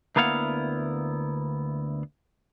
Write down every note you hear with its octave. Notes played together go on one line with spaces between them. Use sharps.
D2 A#3 B3 E4 F5 F#5